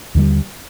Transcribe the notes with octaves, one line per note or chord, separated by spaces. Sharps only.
D#2 D3 G3